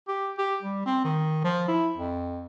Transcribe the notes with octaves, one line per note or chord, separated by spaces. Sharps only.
G4
G4
G3
C4
D#3
F3
E4
F2